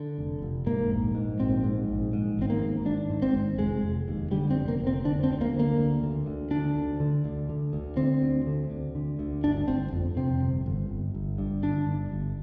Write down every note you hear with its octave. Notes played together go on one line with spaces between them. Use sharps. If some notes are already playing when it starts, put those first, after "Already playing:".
Already playing: D3
F1
F1
G#2 A#3
A#1
G#2
A#1 C4
G#2
A#1
G#2
G#1 C4
A#3
G#2
G#1 D4
G#2
C4
G#1
F1 G#3
F1
D#2
D3 G3
C4
F1
A#3
F1
C4
D3 D4
C4
D2
A#3
D3
A#3
D2
D3
D2
D3 D4
D2
D3
D2
D3
D2
D3 C4
D2
D3
D2
D3
D2
G1 D4
G1 C4
F2
C3 C4
G1
G1
G1
G1
G2
D3 D4
G1
G1